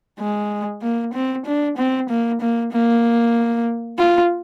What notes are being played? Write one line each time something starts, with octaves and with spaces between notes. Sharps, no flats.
G#3
A#3
C4
D4
C4
A#3
A#3
A#3
F4